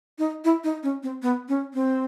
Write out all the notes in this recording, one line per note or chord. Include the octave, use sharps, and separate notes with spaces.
D#4
E4
D#4
C#4
C4
B3
C#4
C4